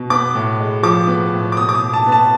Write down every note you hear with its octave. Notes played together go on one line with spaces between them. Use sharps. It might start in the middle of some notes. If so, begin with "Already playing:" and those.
Already playing: B2
B3 D6
A2
G#3
F3 D6
B3
A2
D6
B2 D#6
D6
D#6
B2
A5
B3
A5